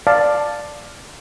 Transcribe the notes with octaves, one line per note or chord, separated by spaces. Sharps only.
D5 F5 A5